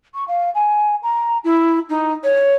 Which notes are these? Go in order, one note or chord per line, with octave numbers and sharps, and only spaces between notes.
C#6
F5
G#5
A#5
E4
D#4
C#5